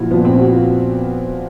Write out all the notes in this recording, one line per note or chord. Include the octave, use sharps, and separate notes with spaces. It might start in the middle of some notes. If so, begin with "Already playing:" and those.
Already playing: A#2 F3 E4 F#4
A#2 F3 B3
C4
F#4
F4